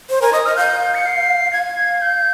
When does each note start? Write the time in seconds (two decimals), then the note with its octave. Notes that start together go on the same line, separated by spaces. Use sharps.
0.10 C5
0.22 A#4 G#5
0.33 D#5 D#6
0.45 D#5 F6
0.57 F5 G6
0.95 C#7
1.06 C7
1.53 F5 G#6
2.02 G6